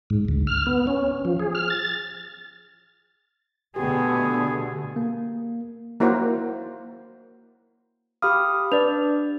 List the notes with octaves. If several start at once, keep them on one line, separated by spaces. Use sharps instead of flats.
G#2
D2
F6
B3
C#4
F3
G#4
F6
A6
B2 D3 A3 B3 G4 G#4
A#3
A#3 E4 F#4 A#4 C5
G4 F5 B5 D#6 F6
D4 B4 D5 F7